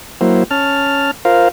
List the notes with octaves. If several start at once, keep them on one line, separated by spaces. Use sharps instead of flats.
F#3 A#3 E4 C5
C#4 A5 F6
F4 A#4 C5 F5